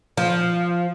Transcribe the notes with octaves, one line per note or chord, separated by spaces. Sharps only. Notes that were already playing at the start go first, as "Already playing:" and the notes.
F3